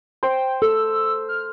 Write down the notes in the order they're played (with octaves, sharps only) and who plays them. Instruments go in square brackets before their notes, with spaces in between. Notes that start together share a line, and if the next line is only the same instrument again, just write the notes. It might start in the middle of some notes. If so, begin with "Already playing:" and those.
[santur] C5 [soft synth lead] G5
[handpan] A4 [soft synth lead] E6
[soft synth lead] F6